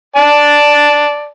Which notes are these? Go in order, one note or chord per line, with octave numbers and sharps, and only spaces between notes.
D5 A5